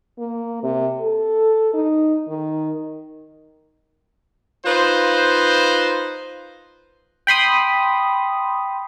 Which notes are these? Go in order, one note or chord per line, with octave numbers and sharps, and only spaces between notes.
A#3
C3
A4
D#4
D#3
D#4 F4 B4 C5
G5 B5 C6 D#6